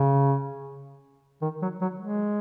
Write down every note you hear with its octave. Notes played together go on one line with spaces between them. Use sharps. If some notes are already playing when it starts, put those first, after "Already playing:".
Already playing: C#3
D#3
F#3
F#3
G#3